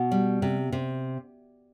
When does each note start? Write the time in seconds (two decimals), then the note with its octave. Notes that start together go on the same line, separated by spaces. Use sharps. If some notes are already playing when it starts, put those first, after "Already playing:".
Already playing: B2
0.11 G3
0.42 C3
0.72 C3